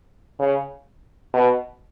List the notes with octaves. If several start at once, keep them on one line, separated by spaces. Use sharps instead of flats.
C#3
B2